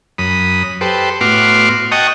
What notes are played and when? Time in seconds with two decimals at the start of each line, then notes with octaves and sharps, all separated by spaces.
0.18 F#2 B5 D#6
0.81 G4 A4 B4 C5
1.21 A2 B3 F#4 C6 D6 F6
1.92 D#5 F#5 G5 A5 C#6 D#6